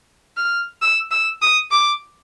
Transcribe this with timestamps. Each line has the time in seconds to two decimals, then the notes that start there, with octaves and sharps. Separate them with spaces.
0.37 F6
0.82 E6
1.11 E6
1.42 D#6
1.71 D6